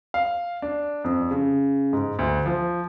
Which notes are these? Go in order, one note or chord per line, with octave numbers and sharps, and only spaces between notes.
F5
D4
F2
C#3
G#2
D2
F3